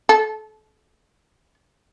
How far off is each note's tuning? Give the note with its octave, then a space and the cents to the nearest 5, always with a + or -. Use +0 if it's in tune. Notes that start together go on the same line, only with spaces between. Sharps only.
A4 -30